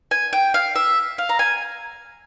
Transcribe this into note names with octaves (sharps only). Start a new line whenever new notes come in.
G#5
G5
F5
E5
F5
A#5
G#5